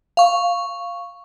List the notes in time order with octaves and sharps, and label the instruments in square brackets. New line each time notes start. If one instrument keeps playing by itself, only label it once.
[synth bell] F5 C#6